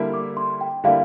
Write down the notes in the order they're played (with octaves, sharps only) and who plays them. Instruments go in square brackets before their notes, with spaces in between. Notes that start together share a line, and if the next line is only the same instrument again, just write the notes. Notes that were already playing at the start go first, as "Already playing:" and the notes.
Already playing: [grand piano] D3 G3 A#3 E4
[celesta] D6
C6
G5
[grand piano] D3 G3 A#3 E4 [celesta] F5